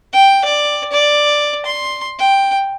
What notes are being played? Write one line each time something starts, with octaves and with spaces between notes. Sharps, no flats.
G5
D5
D5
C6
G5